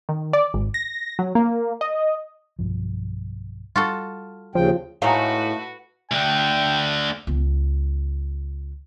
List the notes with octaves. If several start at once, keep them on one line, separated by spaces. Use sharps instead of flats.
D#3
D5
G#1
A#6
F#3
A#3
D#5
B1 G2 F3
G3 F4 F#4 A4
D#2 C#3 F3 G5
A2 G#3 A3 D#4 F#4 B4 F5 A#5
D2 D3 G5
C#2 B3